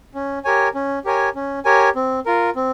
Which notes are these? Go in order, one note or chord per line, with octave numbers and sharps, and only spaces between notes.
C#4
G4 A#4 C#5 G#5
C#4
G4 A#4 C#5 G#5
C#4
G4 A#4 C#5 G#5
C4
F4 A#4
C4